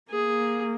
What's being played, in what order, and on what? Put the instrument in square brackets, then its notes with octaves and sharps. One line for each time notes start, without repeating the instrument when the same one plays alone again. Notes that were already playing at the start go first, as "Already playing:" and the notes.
[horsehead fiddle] A#3 [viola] G#4